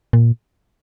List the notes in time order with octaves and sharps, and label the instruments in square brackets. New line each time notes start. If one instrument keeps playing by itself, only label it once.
[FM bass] A#2